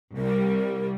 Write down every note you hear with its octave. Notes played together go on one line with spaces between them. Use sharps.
C2 G3 A#4